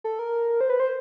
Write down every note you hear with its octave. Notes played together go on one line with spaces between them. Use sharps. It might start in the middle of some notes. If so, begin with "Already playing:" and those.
A4
A#4
C5
B4
C5